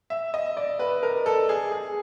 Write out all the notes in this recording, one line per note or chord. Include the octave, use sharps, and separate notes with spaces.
E5
D#5
D5
B4
A#4
A4
G#4
G#4